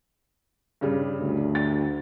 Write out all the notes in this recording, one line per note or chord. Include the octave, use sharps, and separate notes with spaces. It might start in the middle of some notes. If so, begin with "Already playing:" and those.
G2 C#3 G3
D2
A6